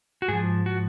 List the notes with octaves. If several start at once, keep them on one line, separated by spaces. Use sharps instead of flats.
F#4
G#2 F3 G#4
F#4